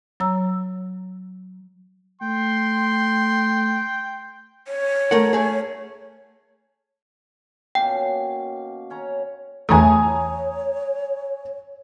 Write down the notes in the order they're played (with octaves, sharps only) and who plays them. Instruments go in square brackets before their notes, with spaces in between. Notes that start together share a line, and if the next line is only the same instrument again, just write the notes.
[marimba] F#3 C#5 A#5 E6
[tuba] A3 [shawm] G5 [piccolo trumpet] C6
[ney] C#5
[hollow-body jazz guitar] A3 A#4 F#5
A3 G#4
[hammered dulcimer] B2 A#3 C#4 [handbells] G5
[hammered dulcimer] C#4 C#5 A#5
[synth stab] E2 E3 A3 [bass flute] C#5 [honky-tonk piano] G#5 A#5 D#6